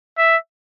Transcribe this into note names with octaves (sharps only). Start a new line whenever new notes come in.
E5